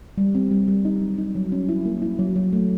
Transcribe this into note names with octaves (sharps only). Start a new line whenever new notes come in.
G3
C4
G3
G3
D#4
F#3
D#4
F#3
C#4
E4
A#3
E4
F#3
F#3
A3